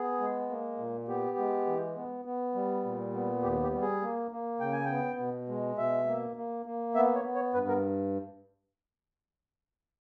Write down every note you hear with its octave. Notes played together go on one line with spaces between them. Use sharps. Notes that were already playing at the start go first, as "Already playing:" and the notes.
Already playing: B3 G#4
G#3
A#3
A#2
B3 G4
G#3
E3
B3
B3
G3
A#2
B3
D#2 G4
G4
G3
G#4
A#3
A#3
C#3 G5
G#5
B3 G5
B2
G#3
B2 E5
A#3
A#3
A#3
B3 E5
C#5
B3
C#5
G2 B4
A#4